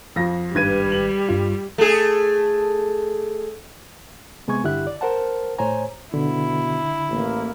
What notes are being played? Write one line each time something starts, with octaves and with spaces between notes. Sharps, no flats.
F2 F3 A#6
G#1 G2 G3 B4 G#6 D#7
F#7
G2 F4
A3 G#4
C3 G#3 B3 G#5 C#6 G#6
G2 D3 E4 G4 E5 F#6
D5
A#4 C5 F#5 A5
A2 C5 C#5 G#5 A#5
B2 D3 E4
A1 A#3